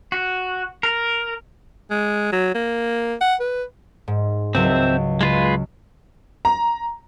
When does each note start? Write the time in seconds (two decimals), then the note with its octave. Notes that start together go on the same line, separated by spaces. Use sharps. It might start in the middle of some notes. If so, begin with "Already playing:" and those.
0.12 F#4
0.83 A#4
1.91 G#3
2.32 F#3
2.54 A#3
3.21 F#5
3.40 B4
4.08 G#2
4.55 C#2 F#3 C4 E5
5.21 C#3 G#3 F4 B4
6.45 A#5